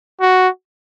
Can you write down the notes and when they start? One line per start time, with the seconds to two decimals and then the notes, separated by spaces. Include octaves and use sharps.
0.21 F#4